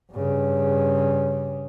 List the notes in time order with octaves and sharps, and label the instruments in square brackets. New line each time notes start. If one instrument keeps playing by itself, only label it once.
[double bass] G2 C#3